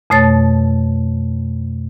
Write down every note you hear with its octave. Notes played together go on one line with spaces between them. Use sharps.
F2 B2 A3 C#5 A6